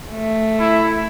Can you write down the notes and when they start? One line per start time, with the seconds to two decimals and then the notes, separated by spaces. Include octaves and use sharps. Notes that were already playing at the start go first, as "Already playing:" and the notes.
0.11 A3
0.60 E4